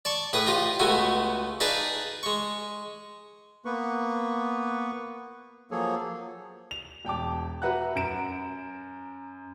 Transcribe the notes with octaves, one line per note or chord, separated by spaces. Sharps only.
D5 A5 C#6
A2 G#4 B4 D#6
F4 G4 D#5
C#2 A3 B3 F#4 G#5
D#4 G#4 B4 D5 F5 A5
G#3 C#6
A#3 B3 B4 C#6
F3 F#3 A#3 G#4 A4 C#5
F7
E1 G5 A5 D6
F#4 B4 E5 F#5 A#5 F#6
F#2 A#5 D7 E7